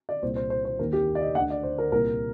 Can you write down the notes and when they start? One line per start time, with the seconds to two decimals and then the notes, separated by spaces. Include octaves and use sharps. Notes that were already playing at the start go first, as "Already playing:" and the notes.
0.09 D5
0.22 C2 A#2 C5
0.36 C5
0.50 C5
0.65 C5
0.79 D#2 A#4
0.82 D#3
0.93 G4
1.15 D5
1.21 D#5
1.35 D2 D3 F#5
1.50 D5
1.63 C5
1.78 A#4
1.92 C2 A#2 A#4